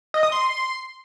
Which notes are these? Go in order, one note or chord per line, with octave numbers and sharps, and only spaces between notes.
D#5
D#6
C6